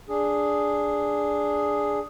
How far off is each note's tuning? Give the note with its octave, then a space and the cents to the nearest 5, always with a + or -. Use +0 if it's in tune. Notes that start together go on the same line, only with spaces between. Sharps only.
D4 +0 G#4 +0